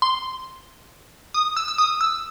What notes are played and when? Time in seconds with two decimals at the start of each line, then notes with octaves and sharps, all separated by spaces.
0.02 C6
1.34 D#6
1.57 E6
1.68 E6
1.78 D#6
2.01 E6